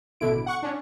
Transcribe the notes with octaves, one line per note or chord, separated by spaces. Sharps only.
A1 B2 D3 E4 D7
F#5 C#6 C#7
C#4 D4